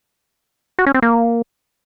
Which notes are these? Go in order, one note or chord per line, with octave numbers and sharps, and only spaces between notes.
F#4
C#4
C4
A#3